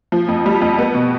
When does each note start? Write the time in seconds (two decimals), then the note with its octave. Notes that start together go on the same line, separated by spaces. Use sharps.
0.12 F3
0.28 F2
0.46 G3
0.61 F2
0.79 B3
0.94 B2